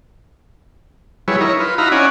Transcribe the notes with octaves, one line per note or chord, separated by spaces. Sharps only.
F#3 G3 E4 G#4 B4 C#5
D#4 E4 A#4 C#5
F4 B4
D#4 E4 F#4 F5 A#5 B5
C#4 D5 D#5 F#5 G#5